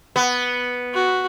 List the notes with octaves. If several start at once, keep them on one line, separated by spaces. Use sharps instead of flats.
B3
F#4